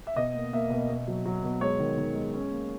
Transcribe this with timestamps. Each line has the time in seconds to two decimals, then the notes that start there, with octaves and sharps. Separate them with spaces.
0.07 E5
0.16 B2 D#5
0.35 A#3
0.53 A#3 E5
0.70 B2
0.89 B2
1.07 F#3
1.25 F#3
1.43 B2
1.61 G#3 C#5
1.79 D#3
1.97 D#3
2.15 G#3
2.34 C#4
2.51 A#3